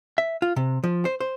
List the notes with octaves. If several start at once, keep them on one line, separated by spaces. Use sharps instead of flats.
E5
F4
C3
F3
C5
C5